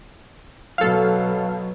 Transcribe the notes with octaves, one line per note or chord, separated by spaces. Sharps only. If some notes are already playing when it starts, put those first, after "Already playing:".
B2 F#3 A4 F5